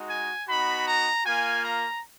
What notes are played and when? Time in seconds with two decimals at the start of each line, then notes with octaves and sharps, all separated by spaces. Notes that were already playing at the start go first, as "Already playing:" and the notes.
Already playing: G#3 D#4 F#4
0.09 G#5
0.48 B3 D#4 F#4 B5
0.87 A#5
1.26 A#3 F4 G#5
1.65 A#5